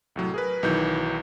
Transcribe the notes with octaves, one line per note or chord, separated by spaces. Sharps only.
C2 A2 F#3
G#4 A#4 B4
B1 D#3 E3 F#3 G6